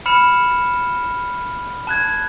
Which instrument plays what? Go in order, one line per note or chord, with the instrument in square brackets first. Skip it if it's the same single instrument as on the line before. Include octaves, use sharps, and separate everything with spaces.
[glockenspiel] B5 F6 C#7 E7
A5 F#6 G#6